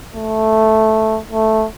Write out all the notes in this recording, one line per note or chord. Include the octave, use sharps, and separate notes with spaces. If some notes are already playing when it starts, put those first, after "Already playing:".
A3
A3